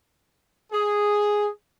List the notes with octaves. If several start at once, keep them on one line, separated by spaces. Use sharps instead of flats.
G#4